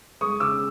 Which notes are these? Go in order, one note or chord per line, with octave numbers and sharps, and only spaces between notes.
G#3 C#6 D#6
C#3 D6 E6